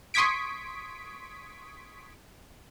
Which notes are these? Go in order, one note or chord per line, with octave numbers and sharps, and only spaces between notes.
C6 C#6 D#6 G#6 B6 D7